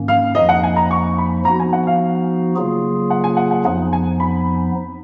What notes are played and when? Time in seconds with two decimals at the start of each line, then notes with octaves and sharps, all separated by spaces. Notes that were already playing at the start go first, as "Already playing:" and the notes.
Already playing: G#2 D#3 A#3 C#4
0.08 F5
0.35 F2 F3 A#3 D#4 D#5
0.49 F#5
0.63 G#5
0.76 A#5
0.91 C#6
1.18 B5
1.45 F3 B3 D#4 F#4 A#5
1.59 G#5
1.73 F#5
1.87 F5
2.56 C#3 F#3 A#3 F4 G#4
3.10 F#5
3.24 G#5
3.37 F#5
3.51 F#5
3.65 F2 F3 B3 D#4 F#5
3.93 G#5
4.20 B5